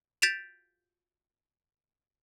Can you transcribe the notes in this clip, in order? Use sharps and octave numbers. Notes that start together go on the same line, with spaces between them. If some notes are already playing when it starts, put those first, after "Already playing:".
G6 A6 B6 D7 E7 F7